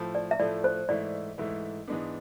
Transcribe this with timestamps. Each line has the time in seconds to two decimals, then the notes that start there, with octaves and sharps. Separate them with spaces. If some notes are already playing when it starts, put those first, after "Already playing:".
Already playing: A2 F3 A3
0.15 D5
0.31 E5
0.39 A2 F3 A3 D5
0.64 C5
0.89 G#2 E3 A3 E4 D5
1.38 G#2 E3 A3 E4
1.87 G#2 E3 G#3 B3 D4